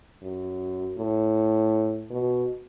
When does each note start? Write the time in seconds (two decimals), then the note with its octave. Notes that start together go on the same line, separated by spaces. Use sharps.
0.22 F#2
0.98 A2
2.10 B2